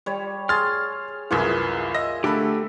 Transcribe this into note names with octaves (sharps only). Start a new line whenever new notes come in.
G3 C#5
G#4 C6 F6 A6
C2 F#2 E3 F4 G#4 A#4
D#5 E5 A#6
D3 A3 G4 A4 B5